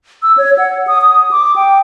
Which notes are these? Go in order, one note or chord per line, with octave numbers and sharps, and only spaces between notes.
E6
C#5
F#5
D#6
D#6
D6
G5